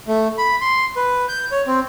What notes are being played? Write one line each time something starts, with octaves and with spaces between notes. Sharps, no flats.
A3
B5
C6
B4
G6
C#5
C4